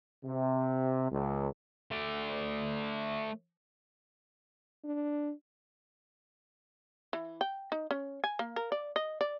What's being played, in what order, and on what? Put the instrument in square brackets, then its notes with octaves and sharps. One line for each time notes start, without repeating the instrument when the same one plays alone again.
[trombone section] C3
C#2
[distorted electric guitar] A3 D5
[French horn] D4
[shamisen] E3
G5
D#4
C#4
G#5
A#3
A#4
D5
D#5
D5